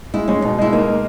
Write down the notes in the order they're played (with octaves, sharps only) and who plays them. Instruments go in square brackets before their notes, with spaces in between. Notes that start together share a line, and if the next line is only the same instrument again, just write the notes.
[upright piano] G#3 [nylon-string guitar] E4
[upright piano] G#3 [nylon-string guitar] C#4
[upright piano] B2 [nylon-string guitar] D#4
[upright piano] G#3 [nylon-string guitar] E4
[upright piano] A#3 [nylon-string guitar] D#4
[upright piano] A#3